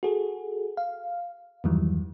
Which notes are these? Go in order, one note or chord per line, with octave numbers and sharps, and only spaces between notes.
F#4 G#4 A4
F5
E2 G2 D#3 E3 F#3 G3